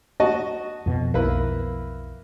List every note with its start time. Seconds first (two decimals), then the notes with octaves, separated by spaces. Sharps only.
0.20 F#4 D#5 A5
0.86 F2 B2
1.14 B1 F2 A#3 E4 B4